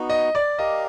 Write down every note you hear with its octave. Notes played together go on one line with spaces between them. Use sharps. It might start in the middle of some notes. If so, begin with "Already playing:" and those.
Already playing: B3 D#4 F#4
D#5
D5
G4 A#4 D5 D#5 F5